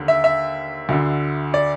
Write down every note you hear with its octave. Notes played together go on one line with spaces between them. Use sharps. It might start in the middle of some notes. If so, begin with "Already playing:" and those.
Already playing: D#2 D3
E5
E5
D2 D3
D5